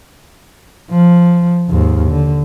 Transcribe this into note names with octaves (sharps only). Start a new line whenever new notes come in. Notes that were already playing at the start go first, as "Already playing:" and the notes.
F3
D#2 G#2
D3